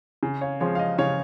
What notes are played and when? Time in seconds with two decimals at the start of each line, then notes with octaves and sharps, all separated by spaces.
0.23 C#3
0.41 C#5 F5
0.60 F3 G#3 C4 C#5
0.75 F5
0.79 D#5
0.98 C#3 C#5 F5